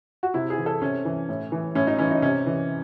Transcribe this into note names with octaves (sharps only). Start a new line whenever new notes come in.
F#4
C3 E4
G#4
E3
A4
C3 C#4
E3
A2
E3
A2 C#4
D#4
E3 C#4
D#4
C3 C#4
E3